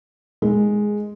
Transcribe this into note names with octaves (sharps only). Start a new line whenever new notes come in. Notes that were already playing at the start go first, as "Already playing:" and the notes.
G#3